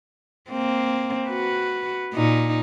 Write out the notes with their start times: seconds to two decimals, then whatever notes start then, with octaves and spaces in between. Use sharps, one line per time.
0.49 A#3 C4
1.28 F#4 B4
2.13 A#2 D#4